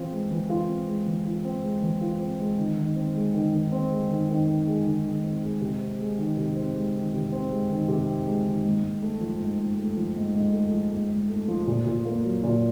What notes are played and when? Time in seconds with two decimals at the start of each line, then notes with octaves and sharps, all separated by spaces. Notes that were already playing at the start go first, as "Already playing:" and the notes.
Already playing: E3 C4 F4
0.12 G#3
0.31 E3
0.50 F4
0.68 C4
0.87 G#3
1.06 E3
1.25 F4
1.45 C4
1.63 G#3
1.82 E3
2.01 F4
2.20 C4
2.39 G#3
2.58 D#3
2.77 D#3
2.96 C4
3.15 G#3
3.34 D#3
3.53 D#3
3.72 C4
3.91 G#3
4.09 D#3
4.29 D#3
4.47 C4
4.67 G#3
4.86 D#3
5.05 D#3
5.24 C4
5.43 G#3
5.61 C3
5.81 C4
5.99 G#3
6.18 D#3
6.37 C3
6.56 C4
6.75 G#3
6.93 D#3
7.13 C3
7.32 C4
7.50 G#3
7.69 D#3
7.88 C3
8.07 C4
8.26 G#3
8.45 D#3
8.64 G#2
8.83 G#2
9.02 A3
9.21 F3
9.39 G#2
9.59 G#2
9.77 A3
9.97 F3
10.16 G#2
10.35 G#2
10.53 A3
10.73 F3
10.92 G#2
11.10 G#2
11.30 A3
11.48 F3
11.67 A#2
11.87 A#2
12.05 A#3
12.25 F#3
12.44 A#2